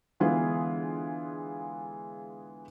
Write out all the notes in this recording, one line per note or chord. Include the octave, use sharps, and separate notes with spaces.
D3 E3 G#3 B3 F4 G#4